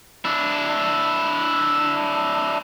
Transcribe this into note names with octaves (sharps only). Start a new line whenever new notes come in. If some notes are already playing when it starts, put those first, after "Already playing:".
D4 E4